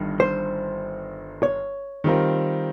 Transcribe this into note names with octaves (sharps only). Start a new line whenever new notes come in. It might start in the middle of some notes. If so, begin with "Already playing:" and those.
Already playing: G1 G2 D#3
C5
C#5
D#3 G3 C4 F4 A#4